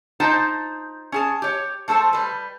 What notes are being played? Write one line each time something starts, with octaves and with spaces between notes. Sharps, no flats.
D#4 F4 C5 G5 A5
C#4 G#4 A5
G4 C#5
F3 A3 A4 C5
G3 B4